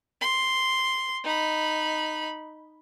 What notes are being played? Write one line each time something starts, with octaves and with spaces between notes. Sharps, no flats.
C6
D#4 B5